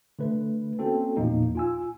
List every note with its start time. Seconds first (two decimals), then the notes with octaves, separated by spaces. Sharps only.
0.19 D3 A3 B4
0.79 A#3 C4 C#4 F#4 A4
1.17 E2 A#2 F3 A#3 D#4
1.55 F4 G#5 E6